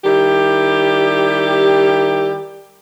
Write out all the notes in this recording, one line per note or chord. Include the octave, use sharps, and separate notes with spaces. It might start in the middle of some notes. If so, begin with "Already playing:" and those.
D#3 G3 E4 G4